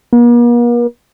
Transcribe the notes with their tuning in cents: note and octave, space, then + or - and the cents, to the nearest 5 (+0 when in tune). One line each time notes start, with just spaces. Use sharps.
A#3 +45